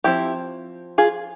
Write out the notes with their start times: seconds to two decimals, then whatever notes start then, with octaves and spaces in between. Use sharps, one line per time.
0.04 F3 C4 E4 G4
0.98 F4 G#4